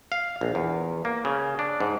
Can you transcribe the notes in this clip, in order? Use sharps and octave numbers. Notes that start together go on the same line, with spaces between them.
F5
A#1
E2
A#3
C#3
D4
G#2